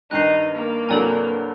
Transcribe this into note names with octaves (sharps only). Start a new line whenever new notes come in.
G2 D#3 G3 D#4 F#6 C7
A#3
C2 G2 F#3 A4 D5 G#5